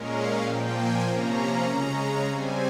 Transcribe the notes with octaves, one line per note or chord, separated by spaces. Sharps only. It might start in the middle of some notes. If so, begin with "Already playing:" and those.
Already playing: A#2 G#3 C#4 A#4
F5
A#2 F3 A#3 G5
G#5
C3 F3 A#3 C#4 A#5
C#3 G#3 C#4 A#5
C#3 G3 C4 G#5